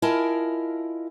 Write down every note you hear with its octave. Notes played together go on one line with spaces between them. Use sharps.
E4 F4 A#4 D#5 G#5 A5